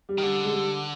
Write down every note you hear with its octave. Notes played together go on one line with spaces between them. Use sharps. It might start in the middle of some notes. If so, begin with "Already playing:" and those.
G3
D#3
D3 G3
G#3
G3